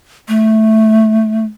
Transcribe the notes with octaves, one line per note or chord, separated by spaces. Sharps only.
A3